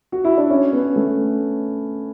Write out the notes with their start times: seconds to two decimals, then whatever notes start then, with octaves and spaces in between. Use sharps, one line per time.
0.12 F#4
0.25 E4
0.38 D4
0.50 C#4
0.73 B3
0.96 A3